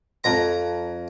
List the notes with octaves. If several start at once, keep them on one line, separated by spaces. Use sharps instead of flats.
F2 A#5